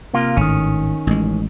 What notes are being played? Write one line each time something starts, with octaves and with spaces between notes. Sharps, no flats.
C3 A#3 F4
G#1 A2 D#3 C#4
A1 G#3